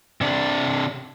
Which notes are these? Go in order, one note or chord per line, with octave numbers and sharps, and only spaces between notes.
C3 D4